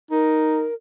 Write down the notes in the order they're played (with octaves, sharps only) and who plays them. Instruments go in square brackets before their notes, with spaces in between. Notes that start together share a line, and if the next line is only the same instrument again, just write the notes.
[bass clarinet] D#4 [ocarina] A#4